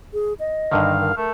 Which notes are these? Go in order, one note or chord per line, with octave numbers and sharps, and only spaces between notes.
G#4
D#5
G2 D3 D#3 F5
A#4
A3 A#4